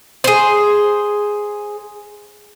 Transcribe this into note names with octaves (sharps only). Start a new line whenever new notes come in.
G#4 C5